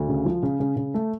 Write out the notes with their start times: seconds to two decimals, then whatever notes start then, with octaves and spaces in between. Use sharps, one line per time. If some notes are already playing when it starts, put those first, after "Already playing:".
Already playing: D2
0.08 C#3
0.25 F3
0.43 C#3
0.60 C#3
0.76 C#3
0.94 A3